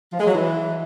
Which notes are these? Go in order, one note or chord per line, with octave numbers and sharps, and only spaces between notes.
F3
G#3
F#3
E3